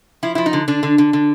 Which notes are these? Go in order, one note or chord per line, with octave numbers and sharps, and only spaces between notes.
F3 E4
F3 E4
D#4
D3
D3 D4
D3
D3
D3